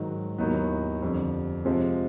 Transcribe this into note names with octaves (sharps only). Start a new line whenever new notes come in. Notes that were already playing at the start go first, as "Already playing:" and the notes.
Already playing: G#2 D#3 F#3
D#2 D#3 F#3 B3 E4
F2 D3 G3
C3 F3 G#3